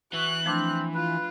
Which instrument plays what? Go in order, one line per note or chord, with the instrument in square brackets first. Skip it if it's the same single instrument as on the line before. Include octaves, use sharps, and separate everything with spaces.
[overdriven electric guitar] E3 [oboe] F#4 [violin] F#6
[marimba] F3 A3 D4 [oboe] C4
[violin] F4 [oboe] B4